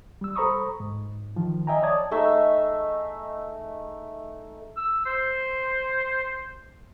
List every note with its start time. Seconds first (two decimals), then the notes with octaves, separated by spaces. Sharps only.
0.21 G3 E6
0.36 A4 C5 A#5 B5 C#6 D#6
0.80 G#2
1.36 D#3 F3
1.67 D#5 E5 G5 G#5 A#5
1.82 C#5 D5 A5 D#6 G#6
2.11 A3 D#4 G#4 E5
4.77 E6
5.06 C5